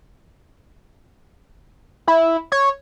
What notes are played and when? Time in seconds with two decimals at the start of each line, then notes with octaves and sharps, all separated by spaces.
2.07 E4
2.52 C#5